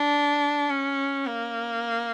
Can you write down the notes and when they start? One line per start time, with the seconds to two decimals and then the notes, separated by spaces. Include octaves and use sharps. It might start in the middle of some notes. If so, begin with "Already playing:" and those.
Already playing: D4
0.71 C#4
1.26 A#3